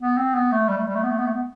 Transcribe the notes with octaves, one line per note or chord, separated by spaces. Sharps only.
B3
C4
B3
A3
G3
A3
G3
A3
B3
A3
B3
A3
B3